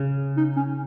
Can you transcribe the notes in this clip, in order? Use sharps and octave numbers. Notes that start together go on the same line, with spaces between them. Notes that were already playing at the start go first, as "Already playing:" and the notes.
Already playing: C#3
D#4
C#4